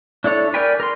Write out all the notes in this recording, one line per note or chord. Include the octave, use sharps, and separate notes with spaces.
D4 E4 A4 C#5
A#4 D5 G5 G#5 B5
A#4 C6